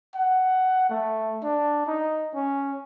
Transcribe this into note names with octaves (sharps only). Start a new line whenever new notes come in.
F#5
A3
D4
D#4
C#4